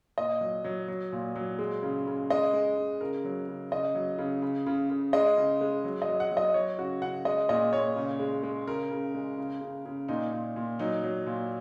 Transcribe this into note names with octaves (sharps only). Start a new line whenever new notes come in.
A#2 D#5
F#3
F#3
F#3
A#2
F#3
G#3
C#3
C#3
G#3 D#5
G#3
G#3
C#3 A#4
F#3
C#3
C#3 D#5
F#3
C#3
C#3
C#3
C#3
G#3 D#5
C#3
G#3
F#3
D#5
F#3
F#5
F#3
D#5
F#3 C#5
C#3 F#4
C#3 F#5
G#3 D#5
A#2 D#5
A#2 C#5
C#3
G#3
G#3
C#3 A#4
C#3
G#3
C#3
C#3
C#3
A#2 D#4
A#2
A#2
F#3 D#4
F#3
A#2